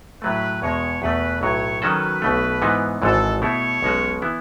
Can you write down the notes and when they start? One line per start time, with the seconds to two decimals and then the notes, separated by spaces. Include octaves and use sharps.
0.22 A2 F#3 A3 B4
0.62 E2 B2 G#3 C#5
1.02 E2 B2 A3 B4
1.41 B1 A2 F#3 C#5
1.82 D#3 F#3 C#4 F#4 A4 B4
2.22 B1 B2 A3
2.62 G#2 E3 B3 D#4
3.02 G#1 G#2 E3 A4
3.42 B2 A3 E4 C#5
3.82 B1 B2 G#3 C#4 F#4
4.22 E3 B3 E4